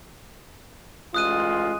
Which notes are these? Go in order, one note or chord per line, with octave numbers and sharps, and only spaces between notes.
A1 G#3 F4 D#6 F#6 D#7